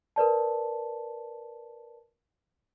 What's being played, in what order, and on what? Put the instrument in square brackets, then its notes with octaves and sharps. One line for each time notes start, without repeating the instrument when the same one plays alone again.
[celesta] A#4 B4 D5 A5